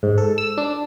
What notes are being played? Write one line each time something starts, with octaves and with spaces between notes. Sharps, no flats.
G#2
A4
E6
D4